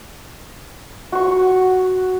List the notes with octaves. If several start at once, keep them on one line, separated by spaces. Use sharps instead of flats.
F#4 C#6